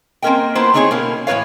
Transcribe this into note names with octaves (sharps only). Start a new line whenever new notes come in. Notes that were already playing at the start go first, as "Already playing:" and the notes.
A#3 C4 C#4 A#4 D#5 G5
A#3 B3 E4 F4 B4 C5
A3 C4 D4 D#4 G#4 C#5
B2 A#3 C#4
A2 E3 F4 B4 C#5 F5